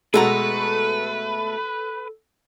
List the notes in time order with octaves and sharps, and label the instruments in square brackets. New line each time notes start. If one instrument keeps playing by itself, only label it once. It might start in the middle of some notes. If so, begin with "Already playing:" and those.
[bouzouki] B2 A3 A#5 [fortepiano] G#3 F#4 [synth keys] A4 [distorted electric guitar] B4